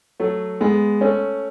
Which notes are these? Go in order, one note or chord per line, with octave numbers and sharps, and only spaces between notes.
F#3 A3
G#3 B3
A3 C#4